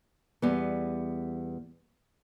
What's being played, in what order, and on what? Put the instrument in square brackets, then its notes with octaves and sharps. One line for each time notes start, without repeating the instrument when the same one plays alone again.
[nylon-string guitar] E2 G3 B3